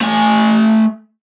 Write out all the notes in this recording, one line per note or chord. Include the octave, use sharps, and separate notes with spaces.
A3 G#5